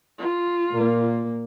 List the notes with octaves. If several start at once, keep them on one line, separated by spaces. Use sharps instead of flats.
F4
A#2 A#3